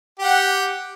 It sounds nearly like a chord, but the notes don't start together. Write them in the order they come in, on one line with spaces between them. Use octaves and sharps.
G4 G5 F#5